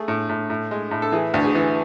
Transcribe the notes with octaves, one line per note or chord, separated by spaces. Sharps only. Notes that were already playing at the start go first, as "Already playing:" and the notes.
Already playing: A3 G#4
A2
A2
A2
G#3
A2
A4
E3 G#4
D2
G#4
E3